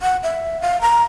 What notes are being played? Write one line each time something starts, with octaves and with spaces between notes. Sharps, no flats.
F#5
E5
F5
A#5